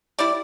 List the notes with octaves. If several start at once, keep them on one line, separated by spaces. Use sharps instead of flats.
G3 E4 D5